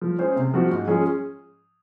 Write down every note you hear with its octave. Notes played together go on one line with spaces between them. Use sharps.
F3
G#3 C#4 G#4 C5
C3
F3 C4 F#4
G#2
F3 G#3 C#4 G#4